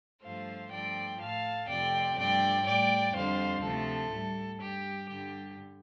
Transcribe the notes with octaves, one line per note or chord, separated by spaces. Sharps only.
G2 F3 A3 C5 F5
G2 F3 A3 D5 G5
A2 A3 F5 A5
F2 C3 F3 A3 D5 G5
G2 F3 A3 D5 G5
A2 G3 D5 G5
F2 D3 G3 C5 F5
D2 C3 F3 A3 A4
A2 G3
G2 G3 G4
G2 D3 G3 G4